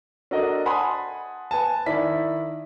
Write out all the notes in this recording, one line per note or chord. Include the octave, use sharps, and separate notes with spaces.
D4 F#4 A4 A#4 D5 D#5
F#5 G#5 A5 B5 C6 D#6
B4 G#5 A5
D#3 E4 D5 B6